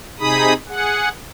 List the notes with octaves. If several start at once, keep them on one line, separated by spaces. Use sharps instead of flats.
C3 D#4 G#4 B5 D#6
G#4 F#5